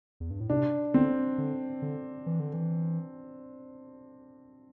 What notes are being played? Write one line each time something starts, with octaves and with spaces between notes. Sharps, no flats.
E2
G2
A2
C3 D4
D3 C4
D3
D3
E3
D3
E3